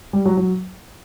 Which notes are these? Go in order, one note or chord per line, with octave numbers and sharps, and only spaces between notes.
G3
F#3
F#3